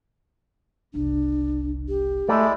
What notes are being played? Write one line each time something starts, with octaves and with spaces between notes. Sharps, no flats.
F#1 C2 D4
G4
G#3 A3 E4 D5